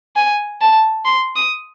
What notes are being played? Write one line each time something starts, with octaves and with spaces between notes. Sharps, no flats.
G#5
A5
C6
D#6